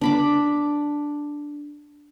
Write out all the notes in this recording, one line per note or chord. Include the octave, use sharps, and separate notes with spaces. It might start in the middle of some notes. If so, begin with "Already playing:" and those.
D4 B5 D6